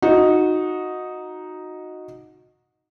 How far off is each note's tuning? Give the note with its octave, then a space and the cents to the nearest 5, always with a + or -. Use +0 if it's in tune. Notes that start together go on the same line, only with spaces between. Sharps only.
D#4 +0 F#4 -20